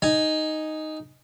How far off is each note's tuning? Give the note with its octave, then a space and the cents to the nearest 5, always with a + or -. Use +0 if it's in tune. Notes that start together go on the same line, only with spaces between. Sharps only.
D#4 +0 G#5 +0